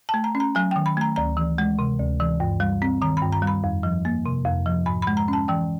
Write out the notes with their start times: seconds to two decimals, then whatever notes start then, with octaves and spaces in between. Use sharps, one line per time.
0.09 A5
0.14 A3
0.24 A#5
0.35 C#4
0.40 A#5
0.55 F#3 G#5
0.71 D#3 G5
0.86 B5
0.97 A3 A#5
1.16 D2 A#5
1.37 E3
1.58 G#3
1.79 C3
1.99 D2
2.20 E3
2.40 G2
2.60 G3
2.82 C4
3.02 D#3 A#5
3.17 B5
3.22 G2
3.32 A#5
3.42 G3
3.47 B5
3.64 F2
3.83 F3
4.05 A#3
4.26 C3
4.45 F2
4.66 F3
4.86 G#2 B5
5.02 G#3 B5
5.17 A#5
5.28 C#4 A5
5.48 E3 G5